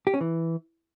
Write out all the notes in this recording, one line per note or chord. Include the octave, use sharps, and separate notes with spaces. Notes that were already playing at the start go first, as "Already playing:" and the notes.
G4
C#4
E3